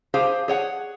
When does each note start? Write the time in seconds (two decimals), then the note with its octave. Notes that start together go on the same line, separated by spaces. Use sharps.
0.14 G4 G#4 C5 F5
0.48 G#4 C#5 F#5